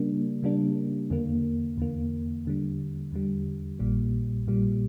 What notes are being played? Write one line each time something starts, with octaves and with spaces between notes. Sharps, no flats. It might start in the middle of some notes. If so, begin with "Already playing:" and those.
Already playing: C#3 G3 A#3 D4
C#3 G3 A#3 D4
E2 D3 A#3
E2 D3 A#3
E2 D3 G3
E2 D3 G3
A#1 A#2 G3
A#1 A#2 G3